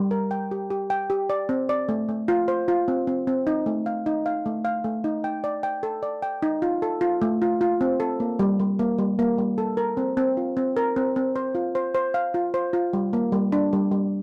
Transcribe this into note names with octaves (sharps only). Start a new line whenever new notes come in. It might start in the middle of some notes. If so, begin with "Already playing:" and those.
Already playing: G3
A#4
G5
G4
G4
G5
G4
D5
C4
D5
A3
A3
F4
C5
F4
C4
C4
C4
D#4
A3
F5
D#4
F5
A3
F5
A3
D#4
G5
D5
G5
A4
D5
G5
D#4
F4
A4
F4
A3
F4
F4
C4
A4
A#3
G3
G3
A#3
G3
A#3
G3
A4
A#4
C4
C4
F4
C4
A#4
C4
C4
C5
F4
C5
C5
F5
F4
C5
F4
G3
A#3
G3
D4
G3
G3